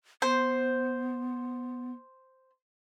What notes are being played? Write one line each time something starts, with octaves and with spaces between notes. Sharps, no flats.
B3 C5